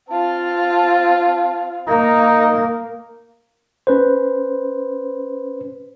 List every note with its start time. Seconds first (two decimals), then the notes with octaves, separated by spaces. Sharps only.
0.10 C4 F4 A5
1.88 A#3 D#4
3.87 C#4 B4 C5